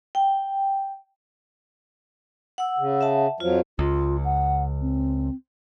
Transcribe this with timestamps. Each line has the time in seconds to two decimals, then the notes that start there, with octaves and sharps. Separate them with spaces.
0.15 G5
2.58 F#5 E6
2.78 C#3
3.01 E5 F#5 A5
3.40 F2 F3 F#3 F4
3.79 C#2 F4
4.25 F#5
4.81 C4